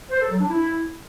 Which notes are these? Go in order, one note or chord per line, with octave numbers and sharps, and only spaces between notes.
C5
A4
F#3
D4
E4